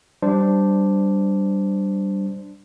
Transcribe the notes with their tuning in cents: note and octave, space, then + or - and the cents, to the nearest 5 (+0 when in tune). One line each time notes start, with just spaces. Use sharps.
G3 -15 D4 +0 C5 -15